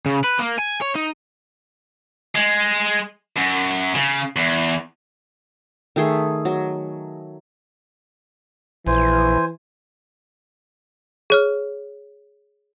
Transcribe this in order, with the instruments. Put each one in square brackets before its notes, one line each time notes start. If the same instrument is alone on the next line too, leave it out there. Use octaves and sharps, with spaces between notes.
[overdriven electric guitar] C#3
B4
A#3
G#5
C#5
D#4
[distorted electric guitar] G#3
F#2
C#3
E2
[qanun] D#3 A3 G#4 C6
F#3
[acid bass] A#1 [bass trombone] E3 [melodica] C5 G#5
[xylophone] G#4 C#5 F6